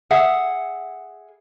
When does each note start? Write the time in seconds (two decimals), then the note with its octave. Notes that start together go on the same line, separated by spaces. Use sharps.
0.11 G#4 E5 F#5